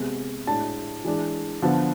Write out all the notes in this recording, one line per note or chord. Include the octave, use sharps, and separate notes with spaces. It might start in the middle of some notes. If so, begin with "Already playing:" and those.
Already playing: C3 G#3 B3
A2 G#3 D4 A5
E3 G#3 D4
D3 F3 B3